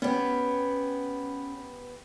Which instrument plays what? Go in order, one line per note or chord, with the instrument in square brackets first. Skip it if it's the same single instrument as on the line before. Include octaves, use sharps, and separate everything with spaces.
[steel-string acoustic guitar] B3 G4 [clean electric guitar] C#4